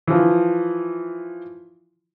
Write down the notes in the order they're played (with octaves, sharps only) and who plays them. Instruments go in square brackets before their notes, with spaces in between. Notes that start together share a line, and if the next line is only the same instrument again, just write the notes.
[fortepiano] E3 F3